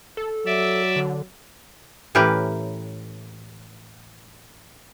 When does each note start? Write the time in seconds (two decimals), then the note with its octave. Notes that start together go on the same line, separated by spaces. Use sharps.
0.17 A4
0.46 F#3 D5 E5
0.96 D3
2.15 A2 E3 C#4 G4 A#4 B4